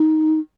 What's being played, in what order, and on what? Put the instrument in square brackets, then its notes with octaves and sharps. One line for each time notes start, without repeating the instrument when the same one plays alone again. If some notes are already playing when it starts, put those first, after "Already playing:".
Already playing: [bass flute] D#4